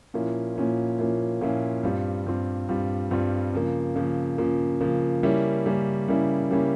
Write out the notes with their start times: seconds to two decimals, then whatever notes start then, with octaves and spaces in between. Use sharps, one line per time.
0.14 A#2 F3 A#3 C#4 E4
0.56 A#2 F3 A#3 C#4 E4
0.99 A#2 F3 A#3 C#4 E4
1.41 A#2 F3 A#3 C#4 E4
1.83 G2 G3 C4 F4
2.26 G2 G3 C4 F4
2.69 G2 G3 C4 F4
3.11 G2 G3 C4 F4
3.53 C#3 F3 A#3
3.96 C#3 F3 A#3
4.38 C#3 F3 A#3
4.81 C#3 F3 A#3
5.23 C#3 G3 A#3 C#4 E4
5.66 C#3 G3 A#3 C#4 E4
6.08 C#3 G3 A#3 C#4 E4
6.50 C#3 G3 A#3 C#4 E4